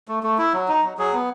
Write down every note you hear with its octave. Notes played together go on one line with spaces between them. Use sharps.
A3
A3
E4
F#3
D#4
F#3
F#3 G#4
B3